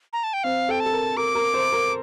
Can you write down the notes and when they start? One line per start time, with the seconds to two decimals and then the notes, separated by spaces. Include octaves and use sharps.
0.13 A#5
0.24 A5
0.33 G5
0.44 C4 F5
0.69 A4 G5
0.80 A5
0.86 A4
0.93 A#4
1.17 A#4 D6
1.35 A#4
1.54 C5
1.72 A#4